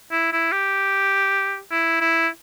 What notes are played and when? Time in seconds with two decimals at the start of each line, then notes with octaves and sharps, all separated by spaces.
0.11 E4
0.32 E4
0.51 G4
1.71 E4
2.01 E4